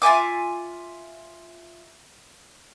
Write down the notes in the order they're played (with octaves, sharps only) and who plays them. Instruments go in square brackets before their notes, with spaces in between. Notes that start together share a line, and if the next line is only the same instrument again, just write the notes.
[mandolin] F4 E5 G#5 D6